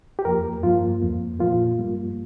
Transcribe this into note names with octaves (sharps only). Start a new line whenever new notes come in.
G4
F2 F3 A#3 A#4
G2 F3 A#3 F4
F2 F3 A#3
A#2 F3 A#3 F4
G2 G3 A#3